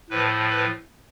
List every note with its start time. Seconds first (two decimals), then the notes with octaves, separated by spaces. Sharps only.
0.10 A2 F3 B4
0.50 B4